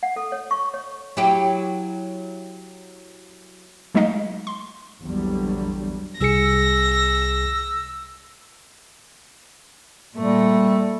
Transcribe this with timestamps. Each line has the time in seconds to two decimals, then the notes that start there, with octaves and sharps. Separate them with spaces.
0.03 F#5
0.16 A4
0.32 C#5
0.51 C#6
0.74 C#5
1.17 F#3 E4 G4
3.95 F#3 G#3 A3 D#4 D#5 F5
4.47 C6
5.01 A#1 E2 D3 F#3 G3
6.21 C2 G#4 E6 A#6 C#7
10.16 A#2 G3 A3